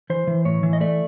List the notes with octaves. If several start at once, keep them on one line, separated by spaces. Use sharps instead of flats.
E3 C5
E3
A2 C#5
E3
D#5
A3 D5